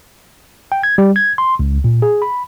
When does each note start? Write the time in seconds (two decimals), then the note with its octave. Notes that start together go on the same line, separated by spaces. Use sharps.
0.72 G5
0.83 G#6
0.98 G3
1.16 G#6
1.38 C6
1.59 C#2
1.84 A#2
2.02 G#4
2.22 B5